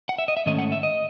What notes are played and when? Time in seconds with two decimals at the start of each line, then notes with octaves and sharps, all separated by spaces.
0.09 F#5
0.18 E5
0.28 D#5
0.37 E5
0.46 G#2 D#3 A3 C#4 D#5
0.59 F#5
0.72 E5
0.83 D#5